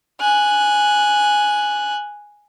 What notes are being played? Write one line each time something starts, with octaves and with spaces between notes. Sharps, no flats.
G#5 F#6